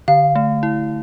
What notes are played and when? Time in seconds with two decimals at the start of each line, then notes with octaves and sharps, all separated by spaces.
0.08 D3 F5
0.35 A3
0.63 E4